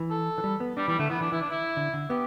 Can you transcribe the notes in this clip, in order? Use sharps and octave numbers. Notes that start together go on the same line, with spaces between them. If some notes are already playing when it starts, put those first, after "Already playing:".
Already playing: E3
A4
E3
G3
B3
G3 D4
E3 G3
D3 A3
E3 B3
E3 D4
E3 E4
D4
E4
D3
D3
B3 G4